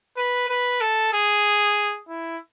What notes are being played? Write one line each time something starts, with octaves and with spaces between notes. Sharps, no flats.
B4
B4
A4
G#4
E4